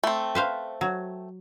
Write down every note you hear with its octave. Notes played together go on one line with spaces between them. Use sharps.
A3 C4
B4 C5 F5
F#3